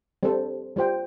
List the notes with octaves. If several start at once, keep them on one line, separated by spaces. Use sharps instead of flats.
G3 C4 A4 C5
G3 F4 C5 G5